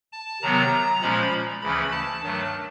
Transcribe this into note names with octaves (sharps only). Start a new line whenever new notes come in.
A5
C3 D#3 F#3 B3 A#5
A#2 F3 G#3 C#4 B5
D2 C#3 E3 A3 C#4 B5
A5
G2 D#3 F#3 A3